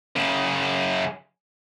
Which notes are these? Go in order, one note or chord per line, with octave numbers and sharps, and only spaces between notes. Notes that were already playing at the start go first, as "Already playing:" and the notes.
F#2 C#3